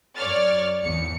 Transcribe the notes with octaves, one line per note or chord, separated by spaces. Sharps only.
F#2 C#5 D5 F6 A6
G#1 E2 C#7